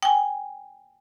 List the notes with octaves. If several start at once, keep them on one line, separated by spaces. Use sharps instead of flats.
G5 G#5